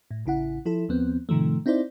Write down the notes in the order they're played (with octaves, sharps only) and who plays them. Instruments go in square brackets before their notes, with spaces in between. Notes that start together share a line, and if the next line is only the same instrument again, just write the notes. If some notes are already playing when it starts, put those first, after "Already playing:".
[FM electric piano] A2
A1 C#3 E4 F#5
F3 E4 A4
D#2 F3 B3 C4
A2 C3 D#3 F3 A3
C4 D#4 E4 C5 D5